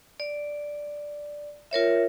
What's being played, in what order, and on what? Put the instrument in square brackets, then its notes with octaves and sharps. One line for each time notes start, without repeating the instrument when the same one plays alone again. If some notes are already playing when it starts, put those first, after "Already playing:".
[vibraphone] D5
F4 A#4 C#5 E5